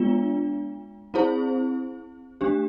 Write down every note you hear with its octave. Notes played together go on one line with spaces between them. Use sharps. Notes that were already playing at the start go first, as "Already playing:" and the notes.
Already playing: G#3 B3 D4 F4
C4 E4 G#4 C5
A3 D4 G4